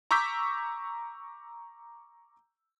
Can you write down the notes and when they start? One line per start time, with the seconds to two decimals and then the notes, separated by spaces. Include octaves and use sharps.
0.11 A#5 C#6 D6 E6 G6 B6